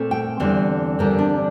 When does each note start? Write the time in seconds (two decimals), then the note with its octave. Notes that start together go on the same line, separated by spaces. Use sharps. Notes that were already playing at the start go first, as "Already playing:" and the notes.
Already playing: A#2 A3 C4
0.11 G5
0.40 E2 D3 G3 C4
0.99 E2 D3 G3 C4 A#4
1.18 D4